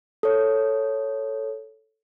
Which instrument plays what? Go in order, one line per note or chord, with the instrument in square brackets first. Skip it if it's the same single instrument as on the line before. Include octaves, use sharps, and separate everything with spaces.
[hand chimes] A4 C#5